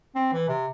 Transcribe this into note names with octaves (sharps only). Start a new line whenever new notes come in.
C4
E3
C3